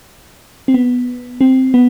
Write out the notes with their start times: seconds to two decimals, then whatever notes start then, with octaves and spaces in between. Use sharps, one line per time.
0.68 C4
0.74 B3
1.41 C4
1.74 B3